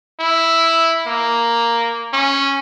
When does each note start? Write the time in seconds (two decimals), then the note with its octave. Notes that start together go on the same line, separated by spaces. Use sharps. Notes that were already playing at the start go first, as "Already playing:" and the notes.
0.20 E4
1.07 A#3
2.13 C#4